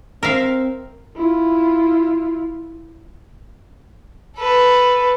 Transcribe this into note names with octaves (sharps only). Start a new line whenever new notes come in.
C4 A#4 E5 F5
E4 F4
A4 B4